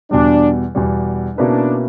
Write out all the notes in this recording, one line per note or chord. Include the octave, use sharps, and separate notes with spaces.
E2 B2 G3 D4
E2 B2 G3
B2 A#3 C#4 D4 E4 B4